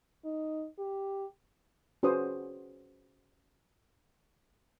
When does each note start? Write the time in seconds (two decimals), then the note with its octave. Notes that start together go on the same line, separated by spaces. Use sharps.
0.25 D#4
0.79 G4
2.03 C#4 F#4 G#4 B4 C5 D#6